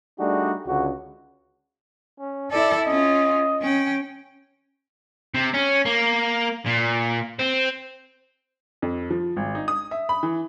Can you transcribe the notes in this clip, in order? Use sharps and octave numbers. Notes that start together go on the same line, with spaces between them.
G3 A3 D4 D#4 F#4 G#4
C#2 D3 F#4
C#4
E4 A4 D5
C#4 F4 D#5
C#4 G5
C3
C#4
A#3
A#2
C4
F2
F3
G#1
D#4
D#6
E5
B5
E3